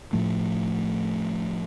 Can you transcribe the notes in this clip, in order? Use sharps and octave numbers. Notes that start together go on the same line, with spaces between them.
A2 F3 A3